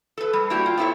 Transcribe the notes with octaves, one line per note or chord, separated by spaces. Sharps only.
A4 B4
G3
A#3 D4 E4 F#4 G4
F4
B3 C4 E4 A4 C#5